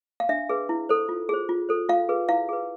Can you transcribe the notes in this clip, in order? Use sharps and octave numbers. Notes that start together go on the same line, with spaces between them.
F5
D4 E5
G#4 B4
E4
A4 C5
F4
G#4 C5
F4
A4 C5
F4 F5
G#4 B4
E4 F5
G#4 B4